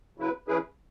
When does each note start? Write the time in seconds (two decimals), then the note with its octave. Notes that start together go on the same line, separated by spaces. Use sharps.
0.18 C#3 F#3 E4 B4
0.48 E3 C#4 E4 G#4 B4